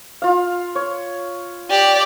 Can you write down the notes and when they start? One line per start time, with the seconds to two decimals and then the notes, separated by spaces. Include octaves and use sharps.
0.22 F4 F5
0.75 C#5
1.70 G4 D5